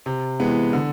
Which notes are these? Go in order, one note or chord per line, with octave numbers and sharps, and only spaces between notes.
C3
E3 G#3 B3
D3